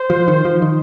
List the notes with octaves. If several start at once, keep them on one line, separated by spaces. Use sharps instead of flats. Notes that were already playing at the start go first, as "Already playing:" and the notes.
Already playing: C5
F3
D#3
F3
D#3